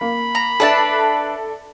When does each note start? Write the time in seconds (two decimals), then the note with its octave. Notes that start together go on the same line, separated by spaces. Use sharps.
0.01 A#3 B5
0.35 A#5
0.60 D4 A4 B4 D5 E5 A5